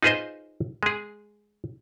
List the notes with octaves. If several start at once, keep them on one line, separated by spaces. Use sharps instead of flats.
D#4 F4 G#4 B4 C5 D#5
G#3 G#4